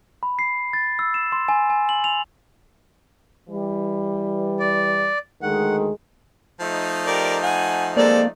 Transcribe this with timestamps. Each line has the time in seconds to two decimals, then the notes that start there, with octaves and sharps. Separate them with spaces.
0.23 B5
0.39 C7
0.73 A6
0.99 E6
1.14 E7
1.32 C6
1.48 G#5
1.70 G#5
1.89 F#7
2.04 F7
3.50 E3 G3
4.60 D5
5.42 D2 D#3 G#3 F#5
6.60 F3 A3 D#4
7.06 G4 A#4 D5
7.43 F#5 G#5
7.97 G#3 A#3 C4 A4 D5